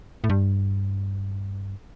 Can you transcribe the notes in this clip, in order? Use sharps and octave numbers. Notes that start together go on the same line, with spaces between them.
A2
G2